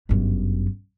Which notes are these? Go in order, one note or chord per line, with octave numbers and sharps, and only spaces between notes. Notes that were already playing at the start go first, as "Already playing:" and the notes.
G1 F#2